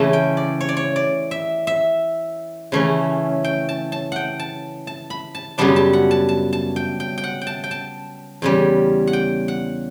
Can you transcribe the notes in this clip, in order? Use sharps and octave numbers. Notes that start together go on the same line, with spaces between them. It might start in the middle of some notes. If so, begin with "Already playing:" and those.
Already playing: C#3 E3 A3 E5 A5
G5
D5
C#5
D5
C#5
D5
E5
E5
C#3 E3 A3 C#4
G5
A5
A5
F#5 G5
A5
A5
B5
A5
F#2 C#3 G3 B3 D4 A5
A5
F#5
A5
A5
A5
G5
G5
G5
F#5
G5
A5
G5
A5
E2 C#3 G3
F#5
G5
F#5